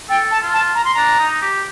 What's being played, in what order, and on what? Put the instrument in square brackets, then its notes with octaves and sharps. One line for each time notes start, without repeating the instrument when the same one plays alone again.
[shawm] A4 [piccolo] G5
[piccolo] A5
[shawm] F4
[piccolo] A5
A#5
C6
[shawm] D4 [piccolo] A#5
[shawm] D#4
G4